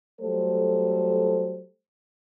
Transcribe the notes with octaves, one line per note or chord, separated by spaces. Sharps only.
F#3 G3 A3 A4 C5